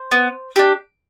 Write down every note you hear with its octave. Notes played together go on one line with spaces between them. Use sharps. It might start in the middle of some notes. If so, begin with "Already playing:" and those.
Already playing: C5
B3
D4 G4